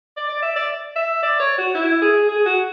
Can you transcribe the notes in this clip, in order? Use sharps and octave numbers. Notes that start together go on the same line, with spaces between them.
D5
D5
E5
D5
E5
D5
C#5
F#4
E4
G#4
G#4
F#4